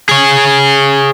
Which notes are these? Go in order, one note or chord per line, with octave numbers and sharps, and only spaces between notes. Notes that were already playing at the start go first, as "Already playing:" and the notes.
G#4 C#5